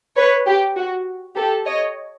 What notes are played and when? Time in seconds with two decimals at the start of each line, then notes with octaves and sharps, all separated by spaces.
0.16 B4 C#5
0.46 G4
0.76 F#4
1.35 G4 A4
1.65 C#5 D#5